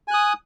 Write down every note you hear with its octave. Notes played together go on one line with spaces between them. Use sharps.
G#5 D#6 F#6